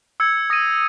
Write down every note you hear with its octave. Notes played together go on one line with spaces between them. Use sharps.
E6 G#6 C#7
D#6 A#6 D#7